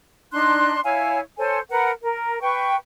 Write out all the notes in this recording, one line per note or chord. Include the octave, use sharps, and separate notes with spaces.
D4 D#4 C6 F#6
E4 C#5 F5 G#5
A4 C5 C#5 G#5
A#4 B4 F#5
A#4
B4 G5 C#6